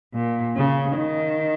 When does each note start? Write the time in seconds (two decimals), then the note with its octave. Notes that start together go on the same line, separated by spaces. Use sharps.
0.14 A#2
0.56 C#3
0.97 D#3